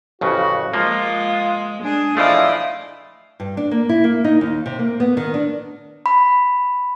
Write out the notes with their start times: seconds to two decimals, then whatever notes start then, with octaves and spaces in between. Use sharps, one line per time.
0.21 A1 F2 C#3 F#4
0.74 F3 G#3 A#3 F4
1.83 D4 G#4
2.17 E3 F3 A3 E4 D5 D#5 F5
3.40 G2
3.57 D4
3.71 A#3
3.89 E4
4.04 A#3
4.24 D#4
4.41 D#2
4.66 C3
4.79 A#3
5.00 B3
5.17 D#3
5.34 D4
6.06 B5